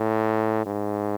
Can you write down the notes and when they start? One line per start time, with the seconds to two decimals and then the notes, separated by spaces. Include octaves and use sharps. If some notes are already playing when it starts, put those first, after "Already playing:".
Already playing: A2
0.66 G#2